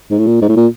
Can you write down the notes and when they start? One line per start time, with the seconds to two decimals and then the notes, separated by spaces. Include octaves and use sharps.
0.10 G#2
0.18 A2
0.27 A#2
0.41 G#2
0.49 A2
0.56 A#2